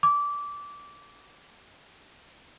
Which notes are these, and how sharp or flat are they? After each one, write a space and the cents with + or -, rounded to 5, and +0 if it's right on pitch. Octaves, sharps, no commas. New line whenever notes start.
D6 -20